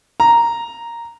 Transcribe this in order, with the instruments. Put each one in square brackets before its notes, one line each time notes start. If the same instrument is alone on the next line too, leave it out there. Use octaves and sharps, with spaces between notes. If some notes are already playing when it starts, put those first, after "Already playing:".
[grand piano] A#5